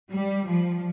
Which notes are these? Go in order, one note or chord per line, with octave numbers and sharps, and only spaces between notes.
G3
F3